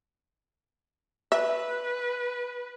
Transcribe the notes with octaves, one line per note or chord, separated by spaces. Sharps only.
B4 E5